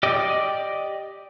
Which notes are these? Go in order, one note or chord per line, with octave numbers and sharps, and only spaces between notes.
G4 D5 D#5